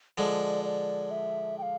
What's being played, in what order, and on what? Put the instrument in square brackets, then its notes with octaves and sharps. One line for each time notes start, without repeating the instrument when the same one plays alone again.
[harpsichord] D3 F3 G#3 [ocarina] D5
[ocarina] D5
E5
G5
F5